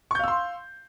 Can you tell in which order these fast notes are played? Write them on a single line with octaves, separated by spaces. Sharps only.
C#6 G6 F5 E6 C6